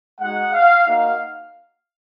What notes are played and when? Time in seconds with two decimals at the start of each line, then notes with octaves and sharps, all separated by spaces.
0.20 G#3 D#4 F#4 F#5
0.54 F5
0.86 A#3 D#4 F#4 F5